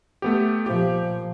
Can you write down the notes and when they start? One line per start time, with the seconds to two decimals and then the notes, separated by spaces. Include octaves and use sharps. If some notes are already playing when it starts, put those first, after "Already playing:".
0.22 A3 B3 G4
0.66 A#2 F3 G4